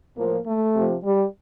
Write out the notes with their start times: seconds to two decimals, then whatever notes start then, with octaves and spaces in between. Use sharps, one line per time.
0.17 A2 F3 A#3
0.46 A3
0.75 C3 F3
1.04 G3